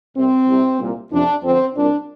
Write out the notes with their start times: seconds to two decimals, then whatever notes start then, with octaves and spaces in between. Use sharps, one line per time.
0.16 C2 C3 C4
0.48 C2 C3
0.80 C2 A#2
1.12 F2 C3 D4
1.43 F2 D3 C4
1.75 C2 A#2 D4